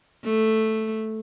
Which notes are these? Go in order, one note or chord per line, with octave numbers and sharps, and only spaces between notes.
A3